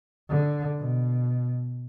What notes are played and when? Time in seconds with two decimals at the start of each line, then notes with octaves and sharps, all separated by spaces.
0.30 D3
0.79 B2